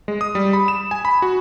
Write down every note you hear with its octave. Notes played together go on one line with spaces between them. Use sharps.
G#3
D#6
G3
B5
E7
G#5
B5
F#4